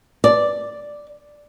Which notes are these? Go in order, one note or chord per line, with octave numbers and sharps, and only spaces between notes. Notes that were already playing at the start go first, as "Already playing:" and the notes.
D5